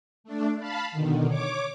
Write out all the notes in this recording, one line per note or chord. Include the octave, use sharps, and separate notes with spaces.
A3 D4
F5 A5 B5
B2 D3 D#3
C#5 D6